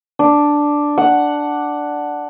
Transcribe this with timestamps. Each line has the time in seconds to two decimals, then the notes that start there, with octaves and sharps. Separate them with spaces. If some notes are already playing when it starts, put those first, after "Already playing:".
0.19 D4
0.98 F#5